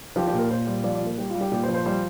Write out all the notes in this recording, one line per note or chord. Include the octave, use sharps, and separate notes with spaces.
F3 G4
G4
A#2
A#4
A#2 C5
G3
F3 D5
D5
A#2
A#4
G3 G4
F4
G3
G4
A#2 G4
C5
F3
C5
G3 C5